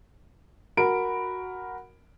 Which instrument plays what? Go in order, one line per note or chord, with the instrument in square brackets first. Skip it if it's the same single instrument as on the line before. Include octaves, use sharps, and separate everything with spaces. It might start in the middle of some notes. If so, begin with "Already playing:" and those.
[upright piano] F#4 A#4 B5 D7